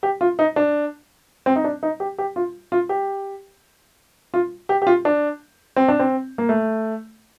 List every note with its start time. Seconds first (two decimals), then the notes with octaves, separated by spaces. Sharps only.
0.03 G4
0.21 F4
0.39 D#4
0.56 D4
1.46 C4
1.56 D#4
1.64 D4
1.83 D#4
2.00 G4
2.18 G4
2.36 F4
2.72 F4
2.89 G4
4.34 F4
4.69 G4
4.82 G4
4.87 F4
5.05 D4
5.76 C4
5.88 D4
5.99 C4
6.38 A#3
6.49 A3